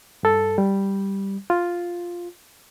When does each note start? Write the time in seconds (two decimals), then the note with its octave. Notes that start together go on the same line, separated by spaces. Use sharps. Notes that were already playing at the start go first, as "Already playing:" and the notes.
0.23 G2 A4
0.58 G3
1.50 F4